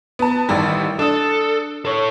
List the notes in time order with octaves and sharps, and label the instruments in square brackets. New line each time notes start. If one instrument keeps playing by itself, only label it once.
[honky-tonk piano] B3 A5
A1 D#3 G3
[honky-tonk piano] D4 D#6 [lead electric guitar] A4
[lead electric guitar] A4 C#5